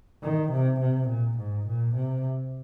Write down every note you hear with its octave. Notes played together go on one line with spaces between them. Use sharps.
D#3
C3
C3
A#2
G#2
A#2
C3